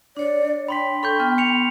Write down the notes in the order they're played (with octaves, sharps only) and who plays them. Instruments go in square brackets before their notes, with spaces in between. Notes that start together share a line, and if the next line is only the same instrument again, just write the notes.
[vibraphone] D4 C#5 [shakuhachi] D5
[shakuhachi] G5 [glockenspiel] B5 C6 B6
[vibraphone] A4 [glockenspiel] B5 C#6 G6
[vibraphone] B3 [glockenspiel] F6
[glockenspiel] C#7 F7